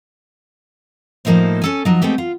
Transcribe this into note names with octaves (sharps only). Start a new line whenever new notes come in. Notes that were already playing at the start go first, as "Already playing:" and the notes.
A2 F3 A#3 D#4 E4 C5
C#4 A4 G#5
F3 F#3 D#4
G#3 A3 B3 C4 G4
F4